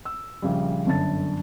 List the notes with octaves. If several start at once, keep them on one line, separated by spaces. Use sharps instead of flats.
E6
A#1 C#3 G3
G1 F#2 D3 A5 A6